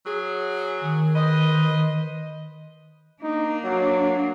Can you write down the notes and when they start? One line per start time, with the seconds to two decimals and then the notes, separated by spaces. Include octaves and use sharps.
0.05 F#3 G#4
0.82 D#3
1.15 B4 C5 D#5
3.22 A#3 D4 D#4
3.64 F#3